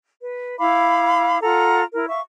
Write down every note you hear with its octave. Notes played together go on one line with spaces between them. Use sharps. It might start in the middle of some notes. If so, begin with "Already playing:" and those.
B4
E4 F5 B5 D6
F4 A4 F#5 A#5
E4 A#4
E5 F5 C#6